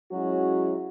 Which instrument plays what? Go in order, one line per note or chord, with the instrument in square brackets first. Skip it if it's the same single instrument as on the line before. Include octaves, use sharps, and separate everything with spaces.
[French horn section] F#3 G#3 C#4 E4 F#4